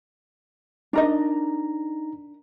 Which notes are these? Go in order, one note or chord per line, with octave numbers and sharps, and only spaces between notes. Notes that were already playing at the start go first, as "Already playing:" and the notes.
D4 D#4 A#4 D#5 A#5